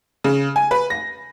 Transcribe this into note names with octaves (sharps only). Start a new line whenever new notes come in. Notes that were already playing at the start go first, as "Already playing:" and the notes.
C#3
G#5
B4
A#6